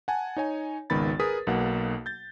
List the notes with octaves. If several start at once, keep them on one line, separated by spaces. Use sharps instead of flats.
F#5 G#5 A5
D#4 C#5 G#5
G#1 C#2 D#3 B3 B5 A6
G#4 A#4 B4 D#6 B6
B1 B2 A#3 F#5
G6 A6